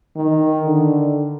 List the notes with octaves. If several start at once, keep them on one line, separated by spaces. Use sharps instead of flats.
D#3
D3